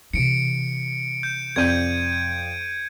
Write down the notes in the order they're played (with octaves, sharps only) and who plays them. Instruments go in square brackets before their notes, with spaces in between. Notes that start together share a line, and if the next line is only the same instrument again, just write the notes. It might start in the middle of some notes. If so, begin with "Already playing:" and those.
[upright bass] C3 E3 [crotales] C#7 D7
[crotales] G6
[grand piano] F2 D5 G6 [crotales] G#6 D#7